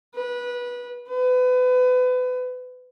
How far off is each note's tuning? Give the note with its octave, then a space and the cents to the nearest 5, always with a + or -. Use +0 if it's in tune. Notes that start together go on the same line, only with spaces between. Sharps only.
B4 -20
B4 +30